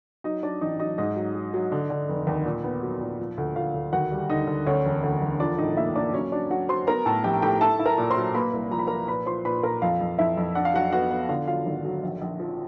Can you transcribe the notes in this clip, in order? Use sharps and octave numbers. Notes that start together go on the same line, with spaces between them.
F#3 D#4 D#5
F#3 D4 D5
A1 D#4 D#5
F#3 D#4 D#5
G#2 D#4 D#5
F#3
F#3
F#3
D3
D3
F1
D#2
A#2
B3
F#3
A#2
F3
D2
D2 F4 F5
D2
D#2 F#4 F#5
G3
D3 D#4 D#5
D3
D2 C#4 C#5
E1
D2
E1
F3 D4 D5
A2 D#4 D#5
A#3 E4 E5
A#3 D4 D5
F#3 C#4 C#5
F#3 D4 D5
F#3 F#4 F#5
F#3 C5 C6
B3 A#4 A#5
A2 A4 A5
A#1 G4 G5
A2 G4 G5
E4 A4 A5
E4
A#4 A#5
A#2
C5 C6
F#3
A#3 B4 B5
C2
F3 A#5
B5
F3 A#4 A#5
A#2 B4 B5
F3 C5 C6
A#2 B4 B5
A#2 A#4 A#5
F2 F4 F5
F2
F2 E4 E5
F2
D4 F#5
F5
F#3 F#4 F#5
B3 F#4 F#5
B3
D3 F4 F5
F#3 F4 F5
G#1
F#3
A#1
A#1
F3